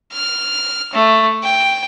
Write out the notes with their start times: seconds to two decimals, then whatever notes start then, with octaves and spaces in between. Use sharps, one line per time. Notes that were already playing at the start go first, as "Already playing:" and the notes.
0.12 F6
0.93 A3
1.44 G5